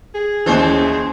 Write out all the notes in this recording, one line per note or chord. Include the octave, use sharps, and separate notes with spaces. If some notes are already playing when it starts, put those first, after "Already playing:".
G#4
D#2 E3 A3 C#4 C5